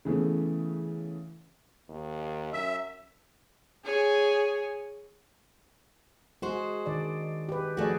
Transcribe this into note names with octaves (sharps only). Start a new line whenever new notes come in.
C#3 E3 A3 B3
D#2
F#2 E5
G#4 C#5 G#5
G#3 F#4 G#4 C5
D#3 D5
G4 B4
F3 A3 F#4 G#4 D5